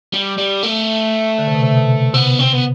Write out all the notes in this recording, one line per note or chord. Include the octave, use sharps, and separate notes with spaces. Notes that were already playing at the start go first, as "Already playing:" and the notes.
G3
G3
A3
D3
C3
B2
C3
B2
C3 B3
C4
B3